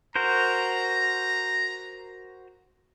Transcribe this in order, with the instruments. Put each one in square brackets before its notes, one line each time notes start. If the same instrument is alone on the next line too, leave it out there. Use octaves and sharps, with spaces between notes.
[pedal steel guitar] F#4 A#4 C5 [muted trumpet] A#5